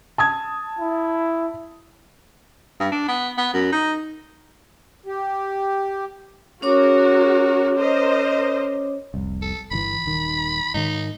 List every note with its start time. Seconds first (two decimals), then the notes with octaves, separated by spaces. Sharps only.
0.18 A5 D#6 G#6
0.79 E4
2.80 G2
2.92 D4
3.08 B3
3.37 B3
3.54 F#2
3.72 D#4
5.06 G4
6.62 C#4 F#4 G#4 A#4 C#5 D6
7.77 A#4 C5 D#5
9.14 F1 C2
9.42 A4
9.71 G1 C#3 E3 B5
10.06 D#1 D#3
10.74 G#2 D#3 D#4